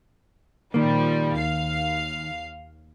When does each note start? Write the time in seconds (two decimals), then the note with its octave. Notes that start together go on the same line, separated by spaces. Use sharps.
0.74 A#2 D#3 F3 G3 A#3
1.38 D#2 F5 C7